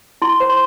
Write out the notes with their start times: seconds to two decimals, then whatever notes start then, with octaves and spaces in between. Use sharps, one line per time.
0.22 E4 C6
0.40 C5
0.49 C6